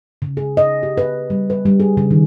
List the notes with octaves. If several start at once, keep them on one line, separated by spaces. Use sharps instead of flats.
C#3
G#4
D#5
G4
B4
G3
B4
G3
G#4
C#3
D#3